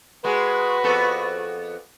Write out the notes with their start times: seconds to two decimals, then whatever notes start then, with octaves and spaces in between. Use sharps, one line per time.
0.25 G#3 F#4 B4
0.84 F2 B3 A4